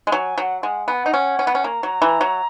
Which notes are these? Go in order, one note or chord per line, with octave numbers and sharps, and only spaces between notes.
G#3
F#3 G#5
F#3 F#5 G#5
G#3 F#5
B3 G#5
F#5
D#4
C#4
C#4
B3
C#4
A#3 A#5
F#3
E3
F#3